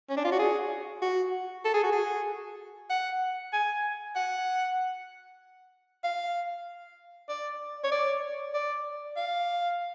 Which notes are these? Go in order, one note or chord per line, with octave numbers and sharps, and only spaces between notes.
C#4
D4
F4
F#4
G#4
F#4
A4
G#4
F#4
G#4
F#5
G#5
F#5
F5
D5
C#5
D5
D5
F5